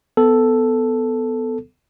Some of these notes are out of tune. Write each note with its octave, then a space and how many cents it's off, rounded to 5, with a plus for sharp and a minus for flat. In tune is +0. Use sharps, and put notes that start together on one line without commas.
B3 +20 A4 +0